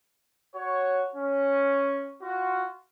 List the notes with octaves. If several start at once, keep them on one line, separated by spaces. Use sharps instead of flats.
F#4 C#5
C#4
F4 F#4